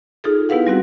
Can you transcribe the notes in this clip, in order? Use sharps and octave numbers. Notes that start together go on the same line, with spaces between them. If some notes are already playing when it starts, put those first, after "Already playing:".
D#4 F4 G#4 A4
B3 E4 G4 B4 F5 F#5
G3 C4 F#4 F#5